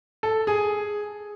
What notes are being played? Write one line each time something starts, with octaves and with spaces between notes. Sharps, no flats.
A4
G#4